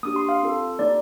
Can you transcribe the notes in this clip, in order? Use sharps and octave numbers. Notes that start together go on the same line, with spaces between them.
A#3 D4 G4 D#6
C6
F5
C4 F4 A4
A#3 D#4 G4 D5